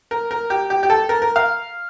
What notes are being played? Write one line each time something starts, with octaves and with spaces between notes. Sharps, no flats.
A#4
A#4
G4
G4
G4
A4
A#4
A#4
F5